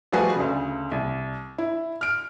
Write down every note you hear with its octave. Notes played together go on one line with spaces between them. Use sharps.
F3 G3 A3 F#4 G#4 B4
D2 C#3
C2
E4
F6 D7